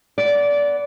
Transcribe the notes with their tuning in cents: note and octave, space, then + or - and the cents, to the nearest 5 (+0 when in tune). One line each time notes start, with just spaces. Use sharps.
B3 +0 D5 -20